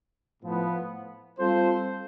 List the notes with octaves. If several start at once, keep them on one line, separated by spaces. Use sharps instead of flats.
A2 F3 B3
G3 C4 F4 A4 C5